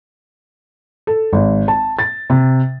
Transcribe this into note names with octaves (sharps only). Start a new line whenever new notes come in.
A4
G#1
A5
A6
C3